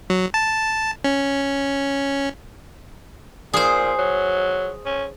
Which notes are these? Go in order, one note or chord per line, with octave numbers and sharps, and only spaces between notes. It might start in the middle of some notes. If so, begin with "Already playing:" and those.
F#3
A5
C#4
A#2 G#4 C5
F#3
C#4